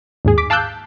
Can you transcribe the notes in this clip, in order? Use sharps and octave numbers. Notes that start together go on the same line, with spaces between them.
D#2 G#2 G#4
D6 B6
F5 A5 D6 E6 F#6 G6